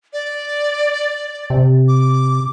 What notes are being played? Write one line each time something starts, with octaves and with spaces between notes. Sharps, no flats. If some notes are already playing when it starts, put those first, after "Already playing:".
D5
C3
D6